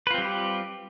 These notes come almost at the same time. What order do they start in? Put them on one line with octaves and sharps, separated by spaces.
B4 F4 C4 G3 G4